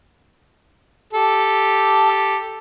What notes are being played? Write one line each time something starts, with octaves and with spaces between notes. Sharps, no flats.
G4 A4